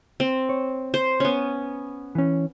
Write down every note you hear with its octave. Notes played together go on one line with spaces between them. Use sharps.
C4
C#5
C5
B3 C#4
E3 C#4